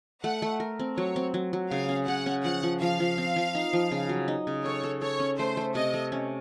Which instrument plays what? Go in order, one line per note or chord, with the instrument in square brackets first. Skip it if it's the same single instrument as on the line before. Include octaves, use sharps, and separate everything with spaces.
[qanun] A3 [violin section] F#5
[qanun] A3
A#4
C4
[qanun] F#3 [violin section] C#5
[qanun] C4
F#3
F#3
[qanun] C#3 [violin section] F5
[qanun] C#4
[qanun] C#3 [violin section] F#5
[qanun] C#4
[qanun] F3 [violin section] F#5
[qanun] F3
[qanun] F3 [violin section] F5
[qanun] F3
C4
F3
D#4
F3
C#3
F#3
D#4
C#3
[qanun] A4 [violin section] C#5
[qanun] A4
[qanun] A4 [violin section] C#5
[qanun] C#4
[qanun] A3 [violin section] C5
[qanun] A3
[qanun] C3 [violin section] D#5
[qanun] A3
C#4